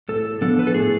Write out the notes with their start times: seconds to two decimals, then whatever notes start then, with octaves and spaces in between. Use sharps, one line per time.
0.09 A2 A4
0.41 F3 B3 D4 A4
0.59 B4
0.67 A4
0.74 A2 G#4